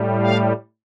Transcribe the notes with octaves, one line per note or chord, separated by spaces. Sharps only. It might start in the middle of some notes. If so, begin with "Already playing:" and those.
Already playing: A2 G3
F5